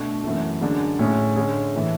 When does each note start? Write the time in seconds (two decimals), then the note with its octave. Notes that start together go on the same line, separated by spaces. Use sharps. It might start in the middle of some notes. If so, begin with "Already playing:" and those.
Already playing: B2 A3 D4 F#4
0.24 F#2 E3 A3
0.61 F#2 D3 G#3 D4
0.99 A2 G#3 C#4 G#4
1.36 D3 G#3 C#4 G#4
1.74 A2 E3 A3